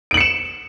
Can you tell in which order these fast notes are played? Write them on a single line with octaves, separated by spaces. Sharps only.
D7 F#7 C#7 E7